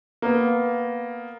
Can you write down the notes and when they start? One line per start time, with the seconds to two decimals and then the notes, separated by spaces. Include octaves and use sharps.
0.22 A#3 B3